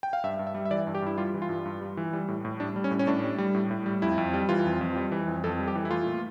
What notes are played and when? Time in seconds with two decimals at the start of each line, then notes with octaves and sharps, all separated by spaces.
0.03 G5
0.13 F5
0.24 G2 E5
0.39 G2
0.47 E5
0.54 G3
0.65 E5
0.71 E3 D5
0.87 G2
0.95 G4
1.02 G2 E4
1.18 G3 F4
1.34 E3
1.42 F4
1.49 G2
1.65 G2
1.81 G3
1.97 E3
2.13 G3
2.28 A2
2.45 A2
2.60 G3 D4
2.76 G3
2.84 C#4
2.91 A2
2.99 C#4
3.07 A2 D4
3.24 G3
3.38 G3
3.55 A2
3.71 A2
3.86 G3
4.02 F2 E4
4.18 F2
4.34 G3
4.49 E3 F4
4.66 F2
4.81 F2
4.96 G3
5.12 E3
5.28 F2
5.44 F2 A4
5.59 G3
5.67 G4
5.75 E3
5.85 E4
5.91 A3 F4
6.06 A#2